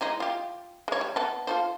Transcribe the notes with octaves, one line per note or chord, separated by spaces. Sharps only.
E3 G#3 D#4
F4 G4
G#3 C#5
G3
B3 A4
F4 A4 C5